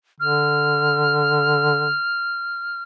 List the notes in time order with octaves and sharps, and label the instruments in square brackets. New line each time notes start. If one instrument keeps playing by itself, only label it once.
[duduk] D3 [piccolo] F6